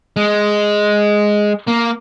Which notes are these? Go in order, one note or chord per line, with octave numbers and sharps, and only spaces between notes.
G#3
A#3